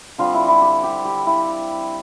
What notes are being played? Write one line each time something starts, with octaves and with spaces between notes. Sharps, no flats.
D3 G3 C4 F4
E4
E4
G4
G4
G4
E4